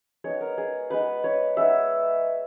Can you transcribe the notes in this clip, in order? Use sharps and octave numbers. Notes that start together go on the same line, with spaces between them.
G#3 B3 D#4 C#5
A#4
G#4
G#3 B3 D#4 B4
C#5
G#3 B3 D#4 E5